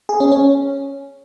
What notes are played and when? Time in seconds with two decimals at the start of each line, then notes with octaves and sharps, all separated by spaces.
0.09 G#4
0.20 C#4
0.32 C#4